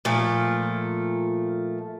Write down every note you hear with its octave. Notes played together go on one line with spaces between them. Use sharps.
A#2 F3 A3